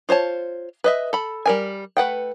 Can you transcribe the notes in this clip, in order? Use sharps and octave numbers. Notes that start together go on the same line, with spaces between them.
F4 C5 C#5 A5
B4 D#5 E5
A4 B5
G3 A#4 G#5
A3 B4 F#5 G5